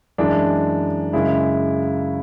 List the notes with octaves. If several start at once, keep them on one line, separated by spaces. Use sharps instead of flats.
F#2 E3 G#3 D4
F#2 C#3 G#3 E4